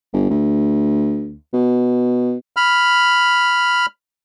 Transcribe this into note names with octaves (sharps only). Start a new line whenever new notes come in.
G1
D2
B2
B5 F6